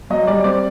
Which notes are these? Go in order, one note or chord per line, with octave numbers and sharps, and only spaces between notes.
F#3 D#5
G3 D5
C4 D5